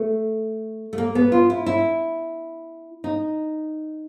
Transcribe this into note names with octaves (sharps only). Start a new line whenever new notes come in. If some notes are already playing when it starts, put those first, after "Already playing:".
Already playing: A3
A3
A#3
B3
F4
E4
E4
D#4